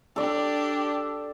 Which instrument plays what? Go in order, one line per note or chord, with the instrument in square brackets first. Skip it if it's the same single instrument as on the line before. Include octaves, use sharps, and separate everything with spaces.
[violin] D4 G4 [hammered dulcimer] A4 D5